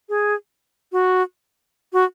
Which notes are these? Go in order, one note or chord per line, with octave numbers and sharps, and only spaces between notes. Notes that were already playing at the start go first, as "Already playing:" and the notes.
G#4
F#4
F#4